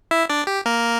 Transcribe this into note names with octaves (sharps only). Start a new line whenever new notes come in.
E4 E5
D4 D5
G4
A#3 A#4